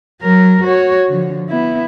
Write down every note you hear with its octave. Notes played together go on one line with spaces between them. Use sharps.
F#3 A#4
F#4 C#5
D3 F3
B3 E4